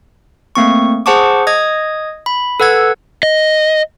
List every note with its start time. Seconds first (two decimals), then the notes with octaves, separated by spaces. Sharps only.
0.55 A3 A#3 C4 C#6
1.06 G#4 C5 F#5 A5 C#6 D6
1.47 D#5 D#6 G#6
2.26 B5
2.60 A4 B4 F#5 E6 G#6
3.23 D#5